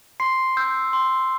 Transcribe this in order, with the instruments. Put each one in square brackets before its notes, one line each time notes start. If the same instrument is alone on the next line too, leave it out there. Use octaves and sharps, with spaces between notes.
[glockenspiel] C6 C7
E6 G6
C6